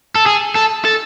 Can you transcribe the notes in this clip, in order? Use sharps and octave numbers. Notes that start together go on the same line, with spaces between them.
A4
G#4
A4
A4